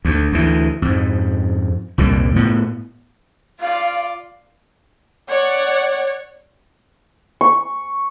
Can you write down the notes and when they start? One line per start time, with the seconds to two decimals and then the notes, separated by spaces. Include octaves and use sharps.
0.05 D2
0.33 D2 E3
0.82 F2 G#2
1.98 C2 F2 A#2 G3
2.36 A2 B3
3.61 F4 D5 F5
5.28 C#5 D5 F#5
7.41 C#6